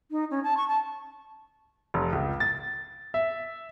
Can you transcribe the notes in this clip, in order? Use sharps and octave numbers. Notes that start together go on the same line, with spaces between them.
D#4
C#4
A5
C#6
A5
F1
C#2
A6
E5